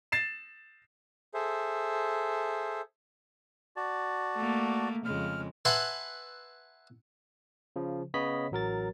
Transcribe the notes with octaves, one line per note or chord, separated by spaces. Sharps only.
A6 C7 E7
G#4 A4 C5 E5
F#4 D5 A5
A3 A#3
F2 C#3 G#3 F6
B4 E5 F#5 G#5 A5 C6
C#3 F3
C#3 B3 C#5 D#5 B5 B6
A1 F#3 A#4 A6